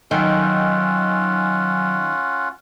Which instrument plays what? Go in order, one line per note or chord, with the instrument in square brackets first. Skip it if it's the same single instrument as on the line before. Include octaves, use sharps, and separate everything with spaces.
[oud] D#3 [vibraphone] F#3 G#5 E6 [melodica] C#4 F4 F#5